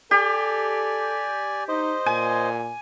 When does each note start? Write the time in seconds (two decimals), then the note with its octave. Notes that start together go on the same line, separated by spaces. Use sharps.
0.11 G4 A4 D5 G#5
1.69 D#4 C5 D#5
2.06 A#2 G#5